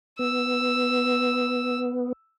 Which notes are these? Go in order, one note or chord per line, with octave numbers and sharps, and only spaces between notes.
B3 E6